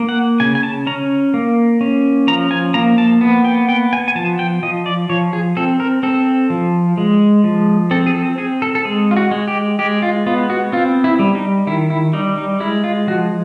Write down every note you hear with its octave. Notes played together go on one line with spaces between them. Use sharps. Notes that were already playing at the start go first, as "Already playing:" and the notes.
Already playing: A#3
F#5
C#3 G#5
G#5
A5
C#4 A#5
A#3
C#4
F3 A#5
G#5
A#3 A#5
A5
B3
G5
B3 G5
G#5
G#5
F3 A5
G5
F3 D#5
D5
F3 C#5
G#4
C4 A4
A#4
C4 A4
F3
G#3
F3
C4 A4
G#4
A4
C4 G#4
A4
A4
G#3 G#4
F4
F#4
G#3
G4
G#3 G4
F4
B3 F4
F#4
C4 F4
E4
G3
D#4
D#3 E4
E4
G3 D#4
D#4
G#3 E4
F4
F3 F#4